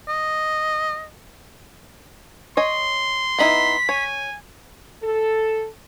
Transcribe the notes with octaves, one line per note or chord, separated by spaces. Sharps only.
D#5
C#5 D#5 C6
B3 D#4 E4 B6
C#5 G#5
A4